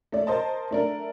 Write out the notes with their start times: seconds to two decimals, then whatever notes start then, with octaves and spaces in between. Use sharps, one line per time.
0.12 A3 D5
0.27 A#4 C5 D#5 A5
0.71 A3 D4 A#4